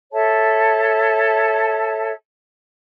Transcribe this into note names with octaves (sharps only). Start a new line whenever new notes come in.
A4 C#5 E5 A5